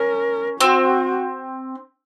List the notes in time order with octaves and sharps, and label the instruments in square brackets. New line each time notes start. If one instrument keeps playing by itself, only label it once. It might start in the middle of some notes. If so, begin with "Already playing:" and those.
Already playing: [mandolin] C#4 [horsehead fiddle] A#4
[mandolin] C4 [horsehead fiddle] F#4